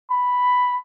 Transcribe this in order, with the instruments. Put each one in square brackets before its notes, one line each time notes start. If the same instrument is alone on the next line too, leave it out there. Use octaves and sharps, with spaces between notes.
[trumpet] B5